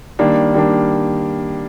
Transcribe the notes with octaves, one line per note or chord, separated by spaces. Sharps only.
D#3 G3 A#3 D4
D#3 G3 A#3 D4